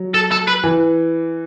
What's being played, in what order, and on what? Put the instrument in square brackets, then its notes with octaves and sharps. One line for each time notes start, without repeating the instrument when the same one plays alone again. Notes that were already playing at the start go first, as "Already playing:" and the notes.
Already playing: [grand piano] F#3
[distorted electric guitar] A4
A4
B4
[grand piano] E3